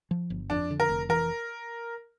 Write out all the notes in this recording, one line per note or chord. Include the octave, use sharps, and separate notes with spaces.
F3
G1
F2 D4
D3
A#4
F1
E3 A#4